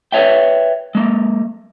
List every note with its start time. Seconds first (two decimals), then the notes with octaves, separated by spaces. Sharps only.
0.12 B4 C#5 E5 G5
0.95 G#3 A#3